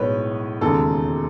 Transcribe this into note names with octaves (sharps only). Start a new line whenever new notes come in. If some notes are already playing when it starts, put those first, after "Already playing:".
Already playing: B1 A2 G#3 B4 C#5
E1 D#2 C#3 G#3 A4